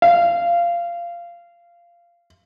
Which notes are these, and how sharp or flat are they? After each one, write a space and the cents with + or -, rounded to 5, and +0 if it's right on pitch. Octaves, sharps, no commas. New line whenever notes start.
F5 -15